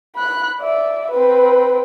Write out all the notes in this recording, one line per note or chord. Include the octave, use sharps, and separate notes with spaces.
B5 F#6
D5 E5
C4 B4